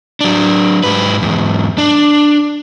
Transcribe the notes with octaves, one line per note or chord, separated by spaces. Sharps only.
F#3 D4
G#2 B4
E2 G#2
D4